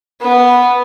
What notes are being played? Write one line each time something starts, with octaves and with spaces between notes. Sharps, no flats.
B3